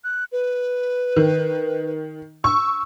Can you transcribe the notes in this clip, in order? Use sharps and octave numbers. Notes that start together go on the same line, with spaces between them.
F#6
B4
D#3
C#6 E6